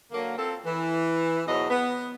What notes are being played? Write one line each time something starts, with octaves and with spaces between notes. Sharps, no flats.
D3 F#3 A#3
C4 F4 A4
E3
E2 G#2 B2 F#3 D#5
B3